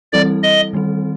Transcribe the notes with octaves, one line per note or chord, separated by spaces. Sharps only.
E3 G3 C4 E4 A4 D5
D#5
D#3 G3 C4